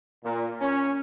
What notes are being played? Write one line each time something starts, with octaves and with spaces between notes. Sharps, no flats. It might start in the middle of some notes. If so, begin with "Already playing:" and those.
A#2
C#4